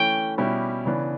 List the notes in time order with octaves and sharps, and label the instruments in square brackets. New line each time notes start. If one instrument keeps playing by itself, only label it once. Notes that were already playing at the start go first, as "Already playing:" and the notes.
Already playing: [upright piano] E3 A3 C#4 [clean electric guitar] G5
[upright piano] B2 G3 C#4 E4 G4
C#3 E3 B3 D4